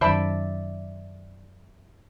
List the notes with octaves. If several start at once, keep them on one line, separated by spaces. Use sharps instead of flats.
F#2 D#3 C5 D5 E5 A5 B5